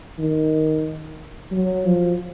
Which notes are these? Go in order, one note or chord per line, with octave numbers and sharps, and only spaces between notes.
D#3
F#3
F3